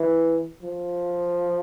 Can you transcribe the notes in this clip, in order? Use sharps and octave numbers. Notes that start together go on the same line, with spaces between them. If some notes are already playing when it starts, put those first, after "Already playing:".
Already playing: E3
F3